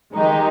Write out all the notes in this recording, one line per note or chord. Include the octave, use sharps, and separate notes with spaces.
D#3 G#3 D#4 G4